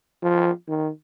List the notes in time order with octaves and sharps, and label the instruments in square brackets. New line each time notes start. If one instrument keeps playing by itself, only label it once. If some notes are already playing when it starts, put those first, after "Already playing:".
[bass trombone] F3
D#3